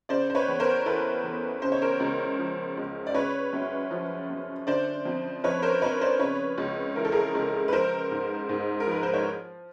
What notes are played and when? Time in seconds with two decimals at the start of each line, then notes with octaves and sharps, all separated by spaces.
0.09 C#3 C5 D5
0.30 C5
0.35 B4 C#5
0.48 E2
0.60 A#4 C5
0.86 E3 A4 B4
1.24 E2
1.62 C#3 C5
1.72 C#5
1.82 A#4 C5
2.00 C#2
2.39 F3
2.77 C#2
3.07 D5
3.14 C#3 B4 C#5
3.53 F#2
3.91 F3
4.30 F#2
4.67 D3 C5 D5
5.05 F2
5.44 F3 B4 C#5
5.62 A#4 C5
5.82 F2 B4 C#5
6.01 C5 D5
6.20 C#3 B4 C#5
6.58 C#2
6.96 E3 A#4
7.05 A4
7.12 G#4 A#4
7.35 C#2
7.68 B4
7.72 F3 A#4 C5
8.11 G#2
8.49 G#2
8.80 A#4
8.87 F3 B4
9.03 C5
9.14 C#5